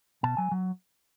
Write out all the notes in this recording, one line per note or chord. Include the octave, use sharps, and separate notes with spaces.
B2 A5
F#3 G#5
F#3